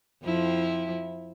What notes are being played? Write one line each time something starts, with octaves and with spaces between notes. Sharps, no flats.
F2 F3 E4